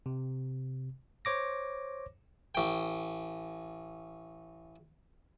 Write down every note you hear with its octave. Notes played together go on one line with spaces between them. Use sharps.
C3
C5 C#5 D6 A#6
A1 G5